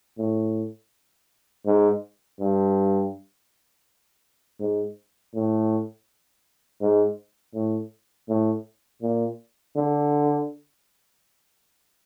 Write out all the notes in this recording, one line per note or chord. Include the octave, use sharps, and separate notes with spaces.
A2
G#2
G2
G#2
A2
G#2
A2
A2
A#2
D3